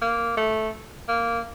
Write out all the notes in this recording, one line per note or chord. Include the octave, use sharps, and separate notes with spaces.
A#3
A3
A#3